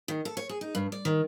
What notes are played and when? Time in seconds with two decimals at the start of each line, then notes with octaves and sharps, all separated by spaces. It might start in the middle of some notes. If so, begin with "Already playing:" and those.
0.08 D#3
0.25 A4
0.37 C#5
0.49 G#4
0.61 D#4
0.75 G2
0.92 D5
1.05 D#3